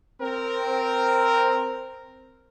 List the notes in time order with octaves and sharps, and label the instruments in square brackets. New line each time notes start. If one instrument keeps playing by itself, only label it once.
[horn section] C4 A#4